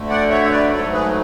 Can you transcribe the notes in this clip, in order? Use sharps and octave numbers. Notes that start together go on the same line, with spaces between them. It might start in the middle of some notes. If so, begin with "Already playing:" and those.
Already playing: D2 D3 A3
D5 F#5
C#5 E5
C#5
B4 D5
G#2 F#3 A3 A4 C#5
G#4 B4